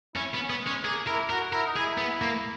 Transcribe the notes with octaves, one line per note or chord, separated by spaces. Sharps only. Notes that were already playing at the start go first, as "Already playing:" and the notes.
C#4 E4
B3
C#4
B3
G#3
C#4
A#3 G#4
E4 A#4
F#4 A#4
E4 A#4
D#4
E4 G#4
B3
A#3